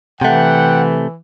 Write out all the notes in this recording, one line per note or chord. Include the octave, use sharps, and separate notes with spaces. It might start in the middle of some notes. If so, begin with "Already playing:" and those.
C3 E3 A3 F#5 G5